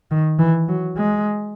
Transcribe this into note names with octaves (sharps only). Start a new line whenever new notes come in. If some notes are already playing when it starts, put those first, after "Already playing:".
D#3
E3
F#3
G#3